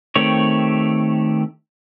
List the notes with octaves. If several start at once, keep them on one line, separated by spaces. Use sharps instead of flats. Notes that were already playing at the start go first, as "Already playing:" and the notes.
D#3 A3 C4 G4 C#5